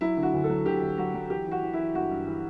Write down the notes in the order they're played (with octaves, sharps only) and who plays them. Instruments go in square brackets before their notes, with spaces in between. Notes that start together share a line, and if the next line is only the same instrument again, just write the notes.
[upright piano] F#3 E4
D3
F#4
D2
A4
F#3
D2 G4
D2
F#3 F#4
F#3
E3 G4
E3 F#4
E3
E4
E3
G2 F#4
G2
E3